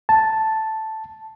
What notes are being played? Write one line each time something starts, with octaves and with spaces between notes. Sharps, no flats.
A5